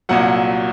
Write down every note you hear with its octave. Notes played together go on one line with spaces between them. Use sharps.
C2 A#2 F#3 F#5